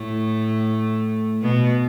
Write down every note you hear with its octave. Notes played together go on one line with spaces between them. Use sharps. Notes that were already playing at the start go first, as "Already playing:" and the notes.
Already playing: A2 A3
B2 B3